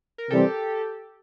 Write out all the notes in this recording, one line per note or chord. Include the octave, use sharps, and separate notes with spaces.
A#4
C3 E3 G3 C4 G4 A4